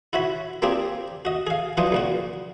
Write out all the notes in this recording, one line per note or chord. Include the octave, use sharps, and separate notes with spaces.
E4 F#4 C#5 B5
A#3 C4 D4 F4 G4 G#4
F#4 D#5
G#4 F5
E3 F#3 D4 F4 G5 D#6
C#2 A#2 F#4